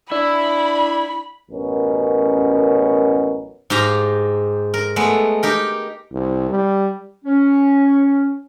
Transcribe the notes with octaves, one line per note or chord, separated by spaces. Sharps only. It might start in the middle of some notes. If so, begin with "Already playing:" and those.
D4 E4 E5 B5
A1 F#2 B2 C#4 A#4
G#2 G4 F5 A#5
A#4
G#3 A3 B3
D#4 G4 A#4
C2
G3
C#4